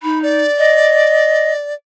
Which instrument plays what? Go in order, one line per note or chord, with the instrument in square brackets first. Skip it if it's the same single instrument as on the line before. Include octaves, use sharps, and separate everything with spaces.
[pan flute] D#4 [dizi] B5
[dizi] D5
[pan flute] D#5